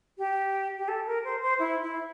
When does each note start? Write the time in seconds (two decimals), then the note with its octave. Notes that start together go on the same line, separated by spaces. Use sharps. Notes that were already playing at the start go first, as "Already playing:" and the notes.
0.18 G4
0.78 G4
0.88 A4
1.06 A#4
1.24 C5
1.41 C5
1.59 E4
1.82 E4